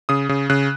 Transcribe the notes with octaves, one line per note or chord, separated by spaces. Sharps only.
C#3 D#6
C#3
C#3 F#6